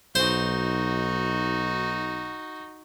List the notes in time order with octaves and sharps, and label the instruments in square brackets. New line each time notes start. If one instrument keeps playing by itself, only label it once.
[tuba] B1 [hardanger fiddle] D#4 F#4 [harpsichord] C5